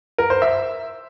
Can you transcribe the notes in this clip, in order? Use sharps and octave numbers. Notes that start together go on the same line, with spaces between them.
A#4
C5
E5